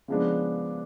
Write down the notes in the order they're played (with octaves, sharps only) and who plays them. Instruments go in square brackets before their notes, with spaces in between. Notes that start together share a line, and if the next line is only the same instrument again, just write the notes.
[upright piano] C#3 F3 G#3 B3 D4